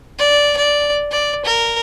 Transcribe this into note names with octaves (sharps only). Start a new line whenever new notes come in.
D5
D5
D5
A#4